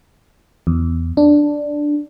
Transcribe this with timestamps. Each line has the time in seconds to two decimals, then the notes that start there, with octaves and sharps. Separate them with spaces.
0.67 E2
1.17 D4